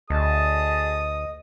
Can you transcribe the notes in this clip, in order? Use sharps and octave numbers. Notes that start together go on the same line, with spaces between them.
D2 G#4 D#5 A5 D#6